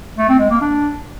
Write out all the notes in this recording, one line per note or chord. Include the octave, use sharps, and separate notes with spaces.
A3
C4
G#3
A#3
D4